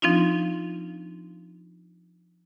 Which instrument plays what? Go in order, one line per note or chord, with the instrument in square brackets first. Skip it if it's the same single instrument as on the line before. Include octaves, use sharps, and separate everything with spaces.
[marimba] F3 C4 D4 D#4 F4